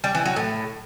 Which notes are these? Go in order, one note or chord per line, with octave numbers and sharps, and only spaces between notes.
G3
E3
F#3
A2